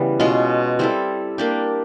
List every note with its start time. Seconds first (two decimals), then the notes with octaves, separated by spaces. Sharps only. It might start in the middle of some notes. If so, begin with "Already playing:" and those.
Already playing: C#3 E3 G3 B3
0.20 B2 G#3 C#4 F4
0.79 G3 C4 E4 A4
1.38 A#3 D4 G4